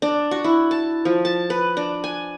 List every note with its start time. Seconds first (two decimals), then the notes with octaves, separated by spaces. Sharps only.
0.02 D4
0.31 F#4
0.44 E4
0.71 A5
1.05 F3
1.25 A5
1.50 B4
1.77 D4
2.04 G#5